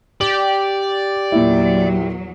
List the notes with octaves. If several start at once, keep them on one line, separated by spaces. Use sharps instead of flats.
G4 D5 F#7
E2 A#2 F#3 E4